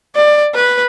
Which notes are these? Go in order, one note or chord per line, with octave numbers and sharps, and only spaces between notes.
D5
B4